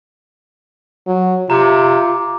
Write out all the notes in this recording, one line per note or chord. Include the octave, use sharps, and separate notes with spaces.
F#3
C3 F4 A#5 D6